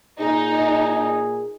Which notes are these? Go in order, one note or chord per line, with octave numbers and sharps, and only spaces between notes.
A#2 D#4 G#4